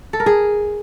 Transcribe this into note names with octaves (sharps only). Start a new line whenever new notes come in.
A4
A#4
G#4